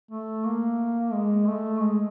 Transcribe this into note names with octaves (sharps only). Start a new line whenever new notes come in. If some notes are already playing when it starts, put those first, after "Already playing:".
A3
A#3
G#3
A3
G#3